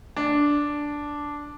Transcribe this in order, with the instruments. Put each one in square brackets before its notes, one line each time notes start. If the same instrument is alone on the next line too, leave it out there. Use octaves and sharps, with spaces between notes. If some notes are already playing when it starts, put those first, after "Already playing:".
[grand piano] D4